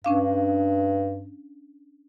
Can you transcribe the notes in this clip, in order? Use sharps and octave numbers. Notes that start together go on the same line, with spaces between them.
G2 C#4 D4 F5